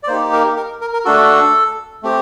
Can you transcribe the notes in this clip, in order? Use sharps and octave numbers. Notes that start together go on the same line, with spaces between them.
D5
A#3 D#4 G4 C5
A#4
A#4
A#4
A#4
A3 D4 F#4 A4
A3 C4 G4